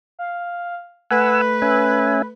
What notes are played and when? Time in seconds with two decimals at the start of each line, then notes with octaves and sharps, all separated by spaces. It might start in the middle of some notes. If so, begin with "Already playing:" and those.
0.19 F5
1.11 A3 B4 F#5 G#5 E6
1.62 C#4 E5 G#5